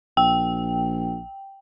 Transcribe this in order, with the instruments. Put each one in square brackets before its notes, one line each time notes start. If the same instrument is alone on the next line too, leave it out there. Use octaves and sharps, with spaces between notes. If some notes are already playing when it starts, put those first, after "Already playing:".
[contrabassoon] A#1 [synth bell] G5